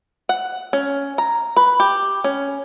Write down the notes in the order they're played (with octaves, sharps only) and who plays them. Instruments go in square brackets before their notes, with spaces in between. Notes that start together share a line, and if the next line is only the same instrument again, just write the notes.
[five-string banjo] F#5
C#4
A#5
B4
G4
C#4